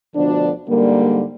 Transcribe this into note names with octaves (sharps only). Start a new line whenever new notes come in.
D2 B2 D3 F3 D4
G#2 D3 G3 A#3